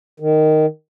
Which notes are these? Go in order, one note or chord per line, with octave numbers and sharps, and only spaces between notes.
D#3